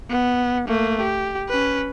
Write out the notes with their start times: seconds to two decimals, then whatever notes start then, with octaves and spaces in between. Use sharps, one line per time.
0.10 B3
0.68 A3 A#3
1.01 G4
1.49 C#4 B4